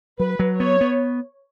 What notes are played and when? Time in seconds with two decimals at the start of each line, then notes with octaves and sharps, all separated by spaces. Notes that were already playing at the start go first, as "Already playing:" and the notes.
0.19 F#3 B4
0.39 F#3
0.60 B3 C#5
0.81 B3